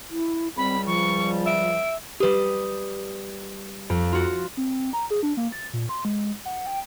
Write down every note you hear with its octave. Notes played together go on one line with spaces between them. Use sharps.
E4
C#2 G3 C4 B5
F3 C#6
E5 D7
G3 G4 B4 D#6
F2
F4 F#4
C4
A#5
G#4
D4
A#3
A6
A#2
C6
G#3
F#5
G5